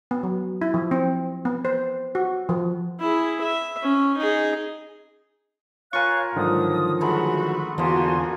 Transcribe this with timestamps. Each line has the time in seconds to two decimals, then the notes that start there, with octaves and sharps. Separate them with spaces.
0.11 B3
0.23 F#3
0.62 E4
0.74 F3
0.91 C4
1.45 B3
1.65 C5
2.15 F#4
2.49 F3
3.01 E4 G#4
3.41 E5
3.83 C#4
4.18 D#4 G#4
5.93 F4 A#4 C#5 F5 G#5 C#6 F#6
6.36 G#2 D3 D#3 F3 F#3 D#6
7.01 F#3 G#3 A3 F#4 B5
7.78 E2 D3 F3 A#3 F4 F#4 G#5 C6